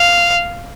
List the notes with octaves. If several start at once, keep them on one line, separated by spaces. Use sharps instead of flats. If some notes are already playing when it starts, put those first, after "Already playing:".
Already playing: F5